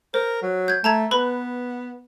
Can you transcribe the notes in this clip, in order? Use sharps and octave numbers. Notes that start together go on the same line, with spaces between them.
A#4 C5
F#3
G6 G#6
A3 A5 A#5 G#6
B3 B4 B5